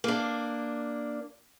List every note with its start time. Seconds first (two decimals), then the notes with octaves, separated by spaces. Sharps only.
0.04 A#3 D4